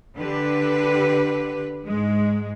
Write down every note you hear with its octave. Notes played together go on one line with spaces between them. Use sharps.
D3 G4 B4
G#2 G#3